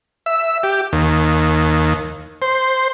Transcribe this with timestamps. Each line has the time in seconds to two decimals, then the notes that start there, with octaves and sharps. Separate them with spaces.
0.26 E5
0.63 G4
0.93 D#2
2.42 C5